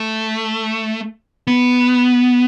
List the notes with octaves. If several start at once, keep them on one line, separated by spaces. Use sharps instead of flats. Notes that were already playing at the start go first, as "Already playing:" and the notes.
Already playing: A3
B3